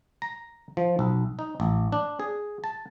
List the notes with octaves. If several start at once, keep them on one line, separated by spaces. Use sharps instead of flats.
A#5
F3
B1
D#4
A1
D4
G#4
A5